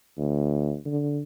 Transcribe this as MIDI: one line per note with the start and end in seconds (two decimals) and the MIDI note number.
0.18 0.77 38
0.86 1.23 50